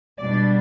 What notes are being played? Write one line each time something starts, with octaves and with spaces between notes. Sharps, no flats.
B2 G3 D4 D5